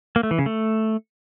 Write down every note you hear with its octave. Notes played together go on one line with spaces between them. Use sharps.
A#3
A3
E3
C#3
A3